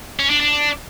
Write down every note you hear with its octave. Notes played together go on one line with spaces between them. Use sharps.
C#4
D4
D4